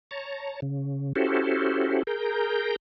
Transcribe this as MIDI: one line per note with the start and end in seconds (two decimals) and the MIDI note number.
0.11 0.60 73
0.11 0.60 81
0.11 0.60 82
0.62 1.13 49
1.16 2.03 61
1.16 2.03 64
1.16 2.03 66
1.16 2.03 67
1.16 2.03 69
1.16 2.03 72
2.07 2.76 68
2.07 2.76 70
2.07 2.76 82
2.07 2.76 91